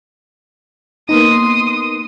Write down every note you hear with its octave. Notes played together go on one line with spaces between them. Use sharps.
A#3 B3 D#4 C6 D#6